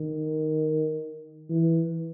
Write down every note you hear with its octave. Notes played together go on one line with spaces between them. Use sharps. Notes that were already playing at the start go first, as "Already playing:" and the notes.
Already playing: D#3
E3